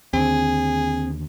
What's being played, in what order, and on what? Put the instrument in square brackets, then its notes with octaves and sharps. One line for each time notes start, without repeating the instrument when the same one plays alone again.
[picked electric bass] D#2 D3 [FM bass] C4 [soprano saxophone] G#4